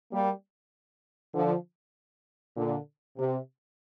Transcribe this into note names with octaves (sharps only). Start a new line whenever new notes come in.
G3 A#3
D3 F3
A#2 D3
C3